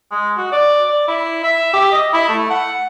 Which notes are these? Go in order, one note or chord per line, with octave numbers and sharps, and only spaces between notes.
G#3
F#4
D5
D5
E4
E5
G4
D#5
E4
A3
F#5